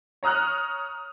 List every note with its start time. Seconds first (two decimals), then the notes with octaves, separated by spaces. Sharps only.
0.23 C#5 A#5 D#6 F6 F#6